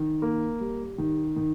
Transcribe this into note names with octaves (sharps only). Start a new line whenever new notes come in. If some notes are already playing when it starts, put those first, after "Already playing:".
Already playing: D#3
A#3
G3
D#3
D#3